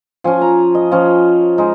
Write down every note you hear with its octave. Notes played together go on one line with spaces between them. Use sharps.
F3 C#4 G#5
A#5
D#5
F3 C#4
G#3 D#4